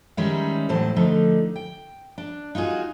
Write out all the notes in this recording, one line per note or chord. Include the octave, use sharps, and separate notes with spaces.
D#3 G3 G#3 C#4 D#4 E4
E2 A2 F#3 C5 A5
D3 F3 A3 D#4
G5
D4
D#4 F4 F#4 G#4